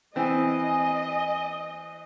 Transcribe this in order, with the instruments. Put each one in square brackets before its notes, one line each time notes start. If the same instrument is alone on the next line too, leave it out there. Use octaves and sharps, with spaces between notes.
[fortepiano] E3 C4 [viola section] D#5 [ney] G#5